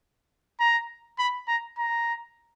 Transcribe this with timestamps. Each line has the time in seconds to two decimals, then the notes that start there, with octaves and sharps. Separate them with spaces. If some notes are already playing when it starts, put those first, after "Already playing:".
0.60 A#5
1.19 B5
1.48 A#5
1.78 A#5